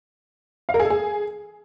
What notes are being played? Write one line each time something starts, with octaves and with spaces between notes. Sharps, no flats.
F5
A#4
G#4
A4
G#4